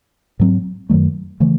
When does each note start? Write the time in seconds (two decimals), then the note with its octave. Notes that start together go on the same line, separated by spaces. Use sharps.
0.40 G#2 F#3 C4
0.89 F#2 D#3 F#3 A3
1.40 C#3 E3 A3